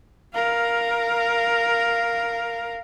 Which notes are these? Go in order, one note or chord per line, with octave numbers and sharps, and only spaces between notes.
A#4 F5